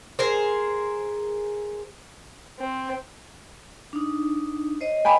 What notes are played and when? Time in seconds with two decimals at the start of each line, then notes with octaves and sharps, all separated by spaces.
0.19 G#4 A#4 C5
2.59 C4
3.93 D4 D#4
4.81 C5 C#5 D#5
5.05 G5 G#5 B5